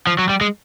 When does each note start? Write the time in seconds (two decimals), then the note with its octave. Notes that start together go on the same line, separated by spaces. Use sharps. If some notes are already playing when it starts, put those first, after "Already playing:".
0.07 F3
0.19 F#3
0.29 G3
0.41 G#3